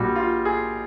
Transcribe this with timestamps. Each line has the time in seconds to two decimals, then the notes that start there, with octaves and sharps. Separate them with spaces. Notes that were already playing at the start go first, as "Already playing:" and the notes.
Already playing: A#1 A#2 G3 F#4
0.16 F4
0.45 G#4